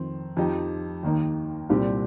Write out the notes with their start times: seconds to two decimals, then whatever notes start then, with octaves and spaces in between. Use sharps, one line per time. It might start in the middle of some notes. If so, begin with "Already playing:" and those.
Already playing: F2 D#3 C4
0.37 F2 F3 D#4 G4
1.03 D#2 D#3 A#3 D#4
1.69 C2 A#2 G3 C4 G4